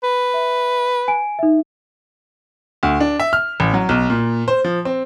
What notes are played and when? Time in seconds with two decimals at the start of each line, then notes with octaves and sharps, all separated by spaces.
0.03 B4
0.34 E5
1.08 G#5 D7
1.39 D#4 E5
2.83 D2
3.00 D4
3.20 E5
3.33 F6
3.60 A1
3.74 F#3
3.89 B1
4.10 A#2
4.48 C5
4.64 F3
4.85 C4